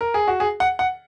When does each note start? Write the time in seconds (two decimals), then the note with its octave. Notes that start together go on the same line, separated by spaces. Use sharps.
0.01 A#4
0.14 G#4
0.28 F#4
0.40 G#4
0.60 F#5
0.79 F#5